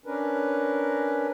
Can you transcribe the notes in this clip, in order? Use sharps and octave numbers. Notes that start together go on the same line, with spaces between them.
C#4 D4 A#4 B4